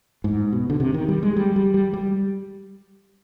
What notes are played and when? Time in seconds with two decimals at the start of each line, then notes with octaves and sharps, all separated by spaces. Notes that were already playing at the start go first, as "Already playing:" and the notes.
0.24 G#2
0.53 B2
0.70 D3
0.80 C3
0.94 D#3
1.08 G3
1.23 G#3
1.37 G3
1.56 G3
1.74 G3
1.93 G3